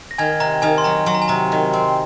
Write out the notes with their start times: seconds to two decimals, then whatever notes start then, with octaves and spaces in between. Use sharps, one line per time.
0.11 A#6
0.18 D#3 G#5 G#6
0.40 C3 A#5
0.62 D#3 G#5
0.78 C6
0.84 F#3 A#5
1.06 F#3 C6
1.15 A#5
1.22 G#5
1.28 C3 A#5
1.52 D#3
1.73 C4